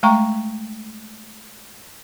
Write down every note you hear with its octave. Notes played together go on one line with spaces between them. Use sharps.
G#3 A3 G5 A#5 C#6